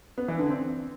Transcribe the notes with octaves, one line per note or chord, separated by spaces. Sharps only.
B3
E3
D3
C4